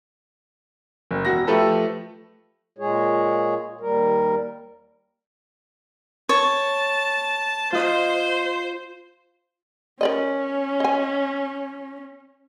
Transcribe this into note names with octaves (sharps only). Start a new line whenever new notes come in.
F#1
E1 F#4 A#6
F3 A3 G4 A4 B4 E5
A#2 G#3 G#4 C#5
D#2 G3 A#4
C#5 A5
F4 C5 D#5
C#4 A#4 D5 D#5
D#5 G#5